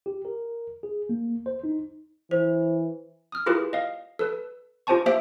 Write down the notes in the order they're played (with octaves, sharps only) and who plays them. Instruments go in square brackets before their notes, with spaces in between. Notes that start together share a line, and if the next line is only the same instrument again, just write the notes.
[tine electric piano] G4
A#4
G#4
A#3
C5
D#4
[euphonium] E3 [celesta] C5
[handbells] D#6 F6
E4 F4 G4 G#4 A#4 B4
D#5 F5
A4 B4
F4 G4 C5 G#5 A5 C#6
A#3 G4 C5 E5 B6 D7